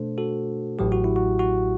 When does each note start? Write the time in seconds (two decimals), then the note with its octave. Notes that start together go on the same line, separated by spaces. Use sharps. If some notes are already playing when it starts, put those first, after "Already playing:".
Already playing: B2 A3 D4 A4 C5
0.18 F#4 A4
0.79 A1 A2 F#3 G4
0.92 F#4
1.04 E4
1.16 F#4
1.39 F#4